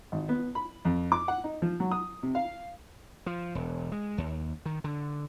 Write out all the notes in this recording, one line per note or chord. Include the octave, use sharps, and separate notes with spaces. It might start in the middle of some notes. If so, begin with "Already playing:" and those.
G#1
B3
B5
F2
D6
F#5
D#4
F3
F#3
D#6
C3
F5
F3
E1
G#3
D#2
D#3
D3